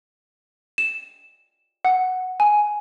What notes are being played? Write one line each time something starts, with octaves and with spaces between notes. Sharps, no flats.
E7
F#5
G#5